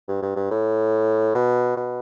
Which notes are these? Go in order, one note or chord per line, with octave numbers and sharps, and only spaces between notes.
G2
G2
G2
A2
B2
B2